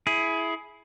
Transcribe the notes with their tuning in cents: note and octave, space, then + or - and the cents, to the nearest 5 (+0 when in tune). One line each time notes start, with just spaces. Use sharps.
E4 +0 G#4 +20